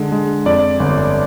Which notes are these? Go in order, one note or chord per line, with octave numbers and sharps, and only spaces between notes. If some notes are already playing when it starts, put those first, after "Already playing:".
Already playing: D3 G#3
G#3
F2 D5
G1